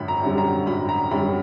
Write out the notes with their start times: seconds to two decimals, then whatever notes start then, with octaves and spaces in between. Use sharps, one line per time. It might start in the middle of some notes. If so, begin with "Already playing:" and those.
Already playing: G#1 F#2 D3 B5
0.08 A#5
0.23 F#2 D3 G3
0.38 A#5
0.66 G#1 B5
0.89 A#5
1.11 F#2 D3 G3 B5